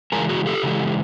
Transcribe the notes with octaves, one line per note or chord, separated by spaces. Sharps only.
C#3 E3 G#3 G#4 A#4
F#4 G#4
G4 A4
C#3 E3 G#3